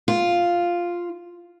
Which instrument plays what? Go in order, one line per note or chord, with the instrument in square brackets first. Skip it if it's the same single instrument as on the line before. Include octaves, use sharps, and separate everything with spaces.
[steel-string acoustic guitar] F4